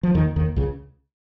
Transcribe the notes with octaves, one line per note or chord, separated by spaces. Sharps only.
F3
D#2 D#3
D#2 D#3
C#2 C#3